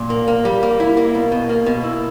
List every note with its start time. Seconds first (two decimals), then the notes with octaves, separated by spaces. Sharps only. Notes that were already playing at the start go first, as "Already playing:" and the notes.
Already playing: A#2
0.10 A#3
0.28 A#3
0.45 G3
0.63 A#3
0.80 E4
0.97 A#3
1.15 B2
1.32 B2
1.49 A#3
1.66 B2
1.84 E4